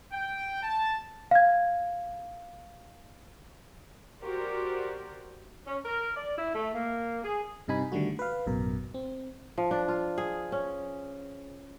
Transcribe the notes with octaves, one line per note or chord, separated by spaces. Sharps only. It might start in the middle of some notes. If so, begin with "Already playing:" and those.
G5
A5
F5 G#6
F#4 G4 A#4 C5 D5
C#4
A#4
D5
E4
A3
A#3
G#4
G2 C3 D#4 G#5 B5
D3 D#3 G3 A3 F#4
B4 F5
A1 F#2 B2 A#4
C4
F3
D4
F4
G#4
C#4